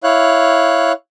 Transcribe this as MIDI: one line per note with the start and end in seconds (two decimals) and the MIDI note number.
0.03 0.92 64
0.03 0.92 73
0.03 0.92 77
0.03 0.92 90